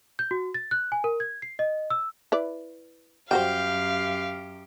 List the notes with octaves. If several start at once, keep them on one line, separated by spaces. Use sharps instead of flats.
G6
F#4
A6
F#6
G#5
A#4
G#6
C7
D#5
E6
E4 B4 D5
F#2 G3 F#4 G4 C5 F5 G5